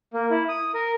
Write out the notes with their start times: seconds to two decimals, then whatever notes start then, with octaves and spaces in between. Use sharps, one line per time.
0.14 A#3
0.31 E4
0.49 D#6
0.74 A#4